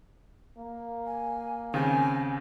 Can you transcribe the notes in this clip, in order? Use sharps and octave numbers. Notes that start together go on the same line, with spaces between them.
A#3
G#5
D#2 C#3 C4 G#5